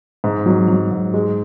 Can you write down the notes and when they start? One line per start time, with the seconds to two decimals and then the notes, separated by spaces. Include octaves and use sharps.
0.24 G#2
0.46 F#3
0.68 F#3
0.91 G#2
1.14 G#3